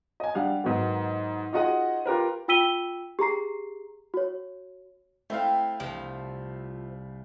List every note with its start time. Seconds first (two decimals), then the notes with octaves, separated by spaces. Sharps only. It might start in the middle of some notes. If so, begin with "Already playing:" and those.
0.20 D#5 G#5
0.35 G3 D4 F5 F#5
0.64 G#2 D#3 F#3 B3
1.53 D#4 F4 F#4 G#4 D#5 F#5
2.06 F4 G4 A#4 B4
2.48 F4 G5 E6 B6 D#7 G7
3.19 G4 G#4 A#5 C7
4.14 F#4 C#5
5.30 A3 C4 E4 F5
5.80 C2 F3